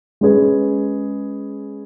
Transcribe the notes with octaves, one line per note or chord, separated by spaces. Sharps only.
G#3 C#4 G#4 B4